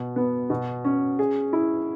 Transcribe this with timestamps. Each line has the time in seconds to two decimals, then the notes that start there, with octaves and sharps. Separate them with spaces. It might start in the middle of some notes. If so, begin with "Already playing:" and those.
Already playing: B2
0.16 B3
0.50 B2
0.85 C#4
1.19 G#4
1.53 E4